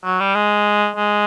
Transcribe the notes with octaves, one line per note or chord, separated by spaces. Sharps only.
F#3
G3
G#3
G#3